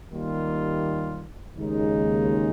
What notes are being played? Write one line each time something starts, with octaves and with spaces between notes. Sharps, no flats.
D#2 D#3 G3 A#3 F4
D#2 C#3 G#3 D#4